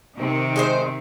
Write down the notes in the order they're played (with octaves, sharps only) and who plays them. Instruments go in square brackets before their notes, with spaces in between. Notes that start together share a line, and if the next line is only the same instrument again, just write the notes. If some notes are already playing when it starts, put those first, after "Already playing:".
[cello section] C3 D#3
[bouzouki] G#3 D#4 C5